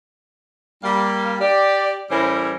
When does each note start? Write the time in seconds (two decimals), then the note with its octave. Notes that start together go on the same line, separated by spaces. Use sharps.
0.84 G3 A#3 F5
1.40 G4 D5
2.10 A2 E3 G3 C#4 A#4 C5